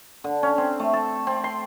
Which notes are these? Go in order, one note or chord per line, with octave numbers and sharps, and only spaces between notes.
D3
C#4
C4
A3
A4
C4
C6